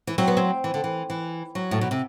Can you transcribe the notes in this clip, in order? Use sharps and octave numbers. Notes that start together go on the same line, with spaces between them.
E3
F#3 C4
B3
C4
E3
D3
E3
E3
F#3
A2
B2
C3